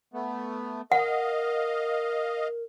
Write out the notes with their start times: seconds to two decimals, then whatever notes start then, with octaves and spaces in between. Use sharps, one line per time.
0.14 A3 B3
0.92 A#4 D#5 F5 F#5